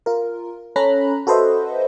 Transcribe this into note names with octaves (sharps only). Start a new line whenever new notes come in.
F4 A#4
C#4 A4 C#5 A#5 B5 F#6
F#4 A4 B4 C5 D#5 E5